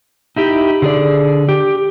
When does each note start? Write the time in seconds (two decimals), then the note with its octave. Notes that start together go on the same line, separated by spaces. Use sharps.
0.36 D#4 E4 G4
0.82 D3 G#4 D5
1.49 G4